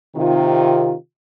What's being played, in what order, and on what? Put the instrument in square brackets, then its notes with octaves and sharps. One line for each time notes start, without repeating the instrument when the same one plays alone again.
[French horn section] C3 D#3 F4